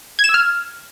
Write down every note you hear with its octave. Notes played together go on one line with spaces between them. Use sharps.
G#6
E7
E6
F6